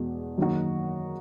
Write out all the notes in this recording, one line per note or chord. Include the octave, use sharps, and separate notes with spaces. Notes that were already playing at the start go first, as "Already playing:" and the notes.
Already playing: E2 B2 G#3
F#2 D#3 A#3 D#4 F#4